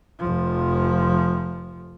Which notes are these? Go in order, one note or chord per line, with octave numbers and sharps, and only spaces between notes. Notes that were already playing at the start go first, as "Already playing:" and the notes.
F1 F3